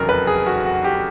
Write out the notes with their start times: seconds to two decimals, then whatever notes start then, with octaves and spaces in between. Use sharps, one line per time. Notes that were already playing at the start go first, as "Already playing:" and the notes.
Already playing: F1 E2 C#3 F#3 A4 A#4
0.09 B4
0.27 G#4
0.46 F#4
0.66 F#4
0.84 G4